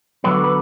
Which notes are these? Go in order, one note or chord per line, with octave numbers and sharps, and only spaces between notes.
D3 F#3 B3 B4
B4